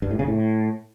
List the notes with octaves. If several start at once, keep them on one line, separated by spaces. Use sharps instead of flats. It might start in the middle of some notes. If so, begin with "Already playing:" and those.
G2
A2
C#3
A2